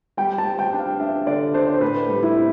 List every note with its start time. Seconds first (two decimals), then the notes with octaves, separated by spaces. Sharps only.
0.17 G3 G5
0.38 A5
0.45 G3
0.59 G5
0.73 D4
0.79 F5
1.00 D4 E5
1.27 D3 D5
1.54 D4 C5
1.67 D5
1.74 C5
1.81 A2 B4
2.09 G3
2.23 E4
2.37 C4